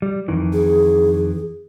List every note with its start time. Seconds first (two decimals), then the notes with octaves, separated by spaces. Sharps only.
0.02 G3
0.28 F2 D#3 E3
0.53 G#4